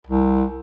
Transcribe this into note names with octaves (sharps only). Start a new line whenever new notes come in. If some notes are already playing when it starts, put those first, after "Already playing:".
C2